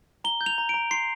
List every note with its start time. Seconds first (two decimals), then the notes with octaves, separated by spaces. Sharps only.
0.24 A#5 G7
0.41 G6
0.46 F7
0.58 A#5
0.69 A#5 D7
0.91 C6 C7